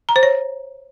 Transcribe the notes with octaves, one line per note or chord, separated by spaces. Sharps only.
A#5
C5
C#5